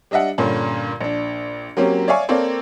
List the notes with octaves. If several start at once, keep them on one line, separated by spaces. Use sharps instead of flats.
G3 D4 D#5 E5 F#5
G2 A#2 D3 C#4
A#1 D4
F#3 A#3 C4 C#4 G4
C#5 D5 E5 F5 G#5 C#6
A#3 C4 A4 C#5 D5 F5